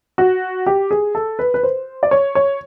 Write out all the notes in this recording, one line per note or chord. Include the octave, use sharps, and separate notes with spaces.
F#4
G4
G#4
A4
B4
B4
C5
D5
C#5
C#5